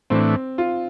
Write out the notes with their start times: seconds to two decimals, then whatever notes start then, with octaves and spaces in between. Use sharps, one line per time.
0.10 A2 E3 A3 C4 D4
0.58 F4